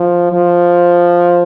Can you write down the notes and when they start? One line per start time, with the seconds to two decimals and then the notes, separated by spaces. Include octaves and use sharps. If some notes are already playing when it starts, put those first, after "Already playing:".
Already playing: F3
0.32 F3